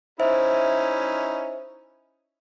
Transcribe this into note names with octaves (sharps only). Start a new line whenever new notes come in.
C#4 D#4 E4 C5 E5